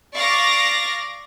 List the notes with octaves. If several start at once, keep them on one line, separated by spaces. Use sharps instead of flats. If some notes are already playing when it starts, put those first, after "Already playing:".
D5 F5 C#6 D6 A6 A#6